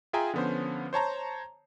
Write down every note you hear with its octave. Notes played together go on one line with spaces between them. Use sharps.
F4 G#4 E5 G5 G#5 A#5
D3 F3 B3 C#4 C5
C5 C#5 A5 A#5